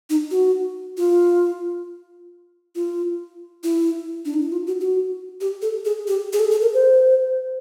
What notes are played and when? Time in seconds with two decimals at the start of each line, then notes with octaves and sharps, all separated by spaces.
0.10 D#4
0.31 F#4
0.97 F4
2.75 F4
3.63 E4
4.25 D4
4.34 D#4
4.42 E4
4.52 F4
4.67 F#4
4.81 F#4
5.41 G4
5.62 A4
5.85 G#4
6.08 G4
6.33 G#4
6.40 A4
6.51 A4
6.62 A#4
6.74 C5